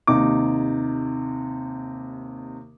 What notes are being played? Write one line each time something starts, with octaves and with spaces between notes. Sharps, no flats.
D#2 C3 D#4 D6